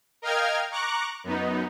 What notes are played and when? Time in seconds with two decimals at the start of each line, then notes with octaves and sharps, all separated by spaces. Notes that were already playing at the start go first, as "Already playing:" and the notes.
0.22 A#4 D#5 F5 G5 F6 G#6
0.71 A#5 C#6 D6 F#6
1.24 F#2 B3 D#4